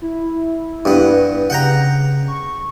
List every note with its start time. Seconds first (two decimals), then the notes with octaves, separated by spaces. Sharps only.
0.02 E4
0.85 G2 B3
1.50 C#3 F#5 G5 A#5
2.28 C#6